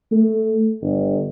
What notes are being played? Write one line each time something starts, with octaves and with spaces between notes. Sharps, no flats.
A3
G1